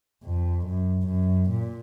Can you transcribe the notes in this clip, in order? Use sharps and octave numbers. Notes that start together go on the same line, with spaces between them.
F2
F#2
F#2
A#2